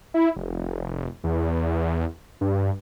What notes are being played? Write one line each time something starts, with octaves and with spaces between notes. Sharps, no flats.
E4
F1
E2
G2